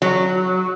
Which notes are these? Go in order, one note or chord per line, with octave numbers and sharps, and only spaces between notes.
F#3